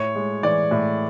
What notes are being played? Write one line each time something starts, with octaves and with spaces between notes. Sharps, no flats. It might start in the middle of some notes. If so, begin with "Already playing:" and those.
Already playing: A2 C#5
G#3
E3 D5
A2